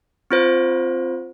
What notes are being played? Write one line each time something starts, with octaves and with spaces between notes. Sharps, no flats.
C4 F4 C5